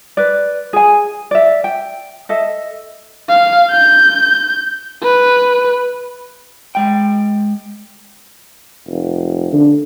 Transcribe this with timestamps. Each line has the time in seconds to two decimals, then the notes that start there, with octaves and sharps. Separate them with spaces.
0.17 B4 D5
0.73 G#4 G#5
1.31 D5 E5
1.64 G5
2.29 A4 D#5 E5
3.30 F5
3.71 G6
5.03 B4
6.75 G#3 G5
8.87 F1
9.53 D3